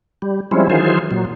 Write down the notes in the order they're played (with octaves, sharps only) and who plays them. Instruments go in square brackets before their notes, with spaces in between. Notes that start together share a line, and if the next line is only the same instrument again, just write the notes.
[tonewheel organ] G3
F3 G3 G#3 C4 C#4 E4
D#3 E3 F#3 F4 G#4 C5
A#2 F#3